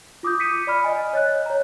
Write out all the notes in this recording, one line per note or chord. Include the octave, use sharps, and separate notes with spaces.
F4 D6 D#6 G6
B6 C#7 D#7
D5 B5 F6
D#5 G#5
C#5 D#5 F#6
C#5 A#5